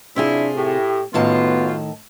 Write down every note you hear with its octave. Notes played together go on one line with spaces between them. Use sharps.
F#2 C3 D4 E4 F4 G#4
A2 G4
F#2 A2 D#3 B3 F4 A5